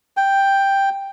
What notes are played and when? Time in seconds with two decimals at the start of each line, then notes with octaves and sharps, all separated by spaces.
0.17 G5